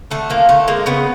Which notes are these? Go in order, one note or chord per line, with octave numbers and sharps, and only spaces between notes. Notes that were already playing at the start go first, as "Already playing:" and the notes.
D3 A3
F3 A#3
D3 A3
G#3 A#3
C#3 B3